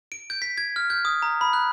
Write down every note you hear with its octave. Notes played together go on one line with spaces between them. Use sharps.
D7
G6
B6
G#6
F6
G6
D#6
A#5
B5
F#6